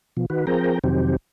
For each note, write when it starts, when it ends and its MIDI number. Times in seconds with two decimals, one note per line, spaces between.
0.17 0.26 47
0.17 0.26 53
0.30 0.45 51
0.30 0.45 66
0.30 0.45 71
0.47 0.79 53
0.47 0.79 60
0.47 0.79 68
0.47 0.79 70
0.47 0.79 79
0.47 0.79 82
0.84 1.16 41
0.84 1.16 48
0.84 1.16 51
0.84 1.16 54
0.84 1.16 60
0.84 1.16 67